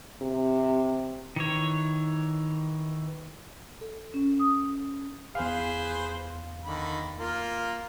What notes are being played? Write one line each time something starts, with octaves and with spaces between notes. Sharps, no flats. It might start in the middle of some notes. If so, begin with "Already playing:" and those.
C3
D#3 E3 C#5
A4
C#4
D#6
E2 G#4 B4 C5 F5
D3 D#3 B5
A#3 F4